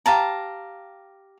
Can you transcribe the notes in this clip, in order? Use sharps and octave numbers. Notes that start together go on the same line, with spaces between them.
G4 F5 A5 A#5